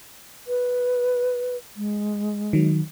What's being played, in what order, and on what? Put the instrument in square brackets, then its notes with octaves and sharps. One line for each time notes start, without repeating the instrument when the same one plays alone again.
[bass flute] B4
G#3
[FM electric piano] D#3 F#3